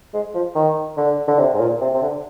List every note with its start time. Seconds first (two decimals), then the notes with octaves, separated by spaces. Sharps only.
0.14 G#3
0.35 F3
0.55 D#3
0.97 D3
1.28 D3
1.39 C3
1.54 G#2
1.60 A#2
1.81 C3
1.94 C3
2.02 D3